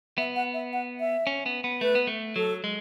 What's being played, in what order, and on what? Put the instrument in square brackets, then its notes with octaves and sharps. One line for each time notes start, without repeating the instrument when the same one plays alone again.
[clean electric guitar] B3 [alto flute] E5
[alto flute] F#5
E5
F#5
E5
[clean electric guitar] C#4
B3
B3
[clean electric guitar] A3 [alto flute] B4
[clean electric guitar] B3
A3
[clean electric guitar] F#3 [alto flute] A4
[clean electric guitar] G#3